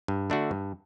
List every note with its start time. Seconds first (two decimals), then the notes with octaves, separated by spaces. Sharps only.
0.08 G2
0.30 D3 A3 D4 F#4
0.51 G2